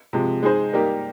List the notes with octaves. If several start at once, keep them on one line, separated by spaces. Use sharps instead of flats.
C3 F3 G#3
G#3 D#4 G#4 C5
G3 A#3 D#4 G4 A#4